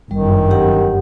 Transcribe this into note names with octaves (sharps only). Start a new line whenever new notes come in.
G1 F#2 D#3 G3
G4 F#5